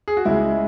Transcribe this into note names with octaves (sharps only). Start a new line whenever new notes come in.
G#4
F#4
C#2 C#3 G#3 E4